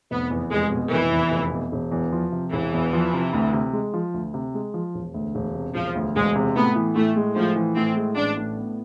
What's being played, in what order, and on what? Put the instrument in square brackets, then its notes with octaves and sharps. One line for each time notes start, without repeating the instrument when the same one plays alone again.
[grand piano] F1 [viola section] B3
[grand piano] E2
[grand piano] F1 [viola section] G#3
[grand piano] B2
[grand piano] F1 [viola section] E3
[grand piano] E2
F1
B2
E1
E2
F3
C3
[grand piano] E1 [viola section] E3
[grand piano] E2
F3
C3
D2
C3
G#3
F3
D2
C3
G#3
F3
E1
D2
E1
C3
[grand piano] E1 [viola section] F3
[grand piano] D2
[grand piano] E1 [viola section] G#3
[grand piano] C3
[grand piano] A2 [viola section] B3
[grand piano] E3
[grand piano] A2 [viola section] A3
[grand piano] G#3
[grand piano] A2 [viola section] F3
[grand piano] E3
[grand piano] A2 [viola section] C4
[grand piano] G#3
[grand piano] A1 [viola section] D4
[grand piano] A2
B3